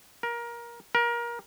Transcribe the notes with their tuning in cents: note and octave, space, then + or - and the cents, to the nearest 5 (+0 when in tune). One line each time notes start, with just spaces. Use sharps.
A#4 +20
A#4 +25